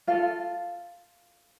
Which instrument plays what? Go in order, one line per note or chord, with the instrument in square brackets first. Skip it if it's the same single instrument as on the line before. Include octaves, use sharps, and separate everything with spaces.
[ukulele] F4 A4 F5